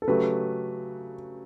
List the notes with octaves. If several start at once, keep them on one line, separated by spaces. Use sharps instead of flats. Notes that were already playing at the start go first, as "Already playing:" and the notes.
A4
C#3 F#3 A3 G4 B4